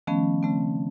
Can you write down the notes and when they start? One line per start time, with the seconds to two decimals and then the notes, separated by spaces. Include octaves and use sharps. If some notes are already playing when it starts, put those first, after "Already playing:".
0.07 D#3 F3 A3 B3 C#4
0.43 C#3 A3 C4